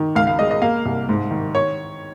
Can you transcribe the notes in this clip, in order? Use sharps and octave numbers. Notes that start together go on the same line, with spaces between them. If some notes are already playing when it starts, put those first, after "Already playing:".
Already playing: D#3
C#2 F5
F5
G#3 D#5
D#5
A#3 F5
C2
G#2
D#3
C#5